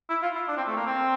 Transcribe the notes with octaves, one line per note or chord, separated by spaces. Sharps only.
E4
F4
E4
D4
C4
A3
A#3
C4